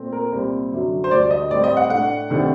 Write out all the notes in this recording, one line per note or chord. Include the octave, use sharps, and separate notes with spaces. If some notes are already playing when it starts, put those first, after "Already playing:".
Already playing: A#2 A3 C4
A#4
C2 A#2 G3 C4
F#2 D3 F#3
C5
D2 D3 G3 D4 D5
D#5
A2 G3 C4 D5
D#5
F#5
A2 A3 D4 F#5
C2 C3 D#3 A3 D4